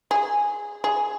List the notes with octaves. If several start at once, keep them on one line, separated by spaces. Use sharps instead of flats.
G#4
G#4